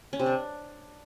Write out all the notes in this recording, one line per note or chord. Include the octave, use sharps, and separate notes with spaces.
C#4
C3
D4